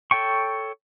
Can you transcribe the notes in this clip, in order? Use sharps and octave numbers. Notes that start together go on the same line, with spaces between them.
A4 C#5 G5 C#6